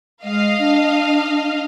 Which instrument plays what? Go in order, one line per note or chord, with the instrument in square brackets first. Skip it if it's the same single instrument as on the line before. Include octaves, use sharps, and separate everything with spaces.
[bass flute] G#3 [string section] D#5 F5
[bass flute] D4